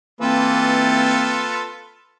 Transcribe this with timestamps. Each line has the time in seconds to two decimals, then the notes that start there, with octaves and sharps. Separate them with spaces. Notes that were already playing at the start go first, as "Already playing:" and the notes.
0.21 E3 A#3 C4 F4 A4 B4